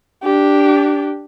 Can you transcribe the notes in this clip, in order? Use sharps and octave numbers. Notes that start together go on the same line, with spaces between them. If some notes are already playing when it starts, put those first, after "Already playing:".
D4 G4